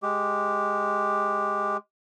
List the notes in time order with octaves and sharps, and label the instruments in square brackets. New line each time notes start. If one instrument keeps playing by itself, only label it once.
[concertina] G#3 G4